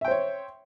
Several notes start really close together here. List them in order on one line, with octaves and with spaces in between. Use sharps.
E5 G5 C5 C#5